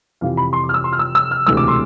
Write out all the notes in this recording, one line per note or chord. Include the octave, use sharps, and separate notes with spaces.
F2 C3 E3 F5
B5
C6
D6
F6
E6
C6
F6
E6
E6
F6
E1 D2 C3 E3 A3 E6
D6
C6